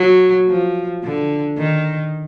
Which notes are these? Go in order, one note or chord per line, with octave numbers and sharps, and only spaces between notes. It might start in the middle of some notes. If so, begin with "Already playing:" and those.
Already playing: F#3
F3
D3
D#3